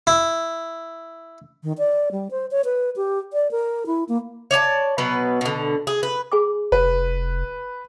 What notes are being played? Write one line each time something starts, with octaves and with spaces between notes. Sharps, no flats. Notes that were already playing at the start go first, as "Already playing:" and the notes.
E4
D#3
D5
G3
C5
C#5
B4
G4
D5
A#4
E4
A#3
C#5 D5 G#5 A5
B2 F#3 B3 B4
B2 D3
G#4
B4
G#4 G#5 D6
F1 B4